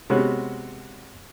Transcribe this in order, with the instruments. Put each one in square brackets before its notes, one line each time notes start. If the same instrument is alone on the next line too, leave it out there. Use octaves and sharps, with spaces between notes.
[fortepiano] C3 G#3 B3 C#4 F#4